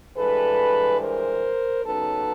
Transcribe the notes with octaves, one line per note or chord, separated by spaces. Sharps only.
G2 E3 G#3 A4 B4
A#4 C5
C#3 F#3 B3 D#4 A4 B4